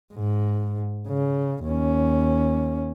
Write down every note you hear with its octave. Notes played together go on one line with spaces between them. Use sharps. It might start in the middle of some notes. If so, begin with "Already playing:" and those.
G#2
C#3
D#2 C#4